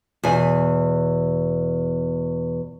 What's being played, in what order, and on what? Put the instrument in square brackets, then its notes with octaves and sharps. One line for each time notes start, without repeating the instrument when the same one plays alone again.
[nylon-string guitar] E2 B2 G#5